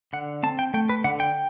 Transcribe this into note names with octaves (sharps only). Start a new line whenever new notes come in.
D3 F#5
C4 A5
G5
A3 G5
B4
D3 F#5
G5